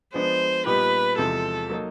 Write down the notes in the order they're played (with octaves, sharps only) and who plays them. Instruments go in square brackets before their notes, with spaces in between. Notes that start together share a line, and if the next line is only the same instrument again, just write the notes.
[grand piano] F3 G#3 B3 D4 [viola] C5
[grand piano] A#2 G3 B3 D#4 G4 [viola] B4
[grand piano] E2 C3 F3 G#3 C4 [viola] A4
[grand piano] F#3 A#3 D#4